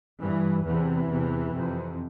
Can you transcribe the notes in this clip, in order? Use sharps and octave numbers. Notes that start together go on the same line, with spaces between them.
G2 E3
E2 C3 E3
E2 C3
F2 C3